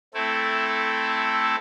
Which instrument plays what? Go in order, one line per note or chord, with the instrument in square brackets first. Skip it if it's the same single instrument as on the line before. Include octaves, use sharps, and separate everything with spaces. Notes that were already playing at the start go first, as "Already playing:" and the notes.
[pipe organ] A3 C4 E4 A4